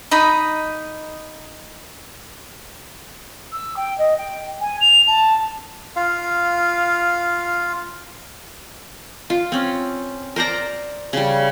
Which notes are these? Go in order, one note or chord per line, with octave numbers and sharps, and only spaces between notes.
D#4 D#5 B5
E6
G5
D#5
G5
G#5
F7
A5
F4 F5
F4
C4 C#4
A#4 C5 D5 A#5
C#3 G3